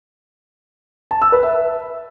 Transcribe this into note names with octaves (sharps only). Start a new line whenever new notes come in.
A5
E6
B4
E5